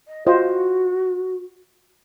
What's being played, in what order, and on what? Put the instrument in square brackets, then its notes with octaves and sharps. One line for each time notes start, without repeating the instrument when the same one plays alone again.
[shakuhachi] D#5
[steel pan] F4 C5 D#5 [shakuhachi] F#4